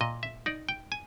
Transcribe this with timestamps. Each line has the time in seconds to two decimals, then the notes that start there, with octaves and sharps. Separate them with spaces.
0.01 A#2 D#5
0.23 E5
0.46 D#4 D5
0.69 G5
0.92 G#5